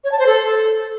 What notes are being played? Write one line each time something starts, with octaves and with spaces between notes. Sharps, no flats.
C#5
A5
C5
A4